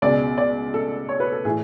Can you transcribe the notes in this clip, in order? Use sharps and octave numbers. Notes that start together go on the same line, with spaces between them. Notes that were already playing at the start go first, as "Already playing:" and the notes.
C#2 B2 G#3 D5
D5
A4
C#5
B4
A4
A2 E3 A3 G#4